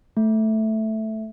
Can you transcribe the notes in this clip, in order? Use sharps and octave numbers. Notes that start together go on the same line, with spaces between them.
A3